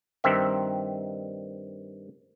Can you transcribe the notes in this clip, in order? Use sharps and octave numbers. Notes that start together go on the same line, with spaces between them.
G2 D#3 C4 E5